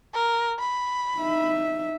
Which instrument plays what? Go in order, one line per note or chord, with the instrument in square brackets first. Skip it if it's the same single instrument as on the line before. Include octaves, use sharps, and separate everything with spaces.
[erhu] A#4
B5
[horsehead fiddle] D#4 E5